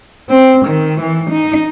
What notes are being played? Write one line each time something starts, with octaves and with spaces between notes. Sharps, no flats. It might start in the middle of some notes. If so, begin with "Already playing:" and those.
C4
D#3
E3
D#4